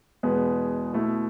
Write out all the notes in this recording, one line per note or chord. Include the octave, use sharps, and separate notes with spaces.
E2 B2 G#3 B3
B2 A3 E4